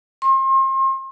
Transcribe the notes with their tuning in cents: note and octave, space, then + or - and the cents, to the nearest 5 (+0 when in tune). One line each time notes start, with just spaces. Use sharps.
C6 +35